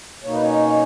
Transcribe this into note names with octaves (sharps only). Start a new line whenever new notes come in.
B2 A#3 D#4 C#5
B4
C#4 C#5